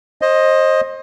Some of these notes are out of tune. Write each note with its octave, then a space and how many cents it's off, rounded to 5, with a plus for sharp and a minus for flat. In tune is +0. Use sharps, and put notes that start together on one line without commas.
C5 +25 D#5 +0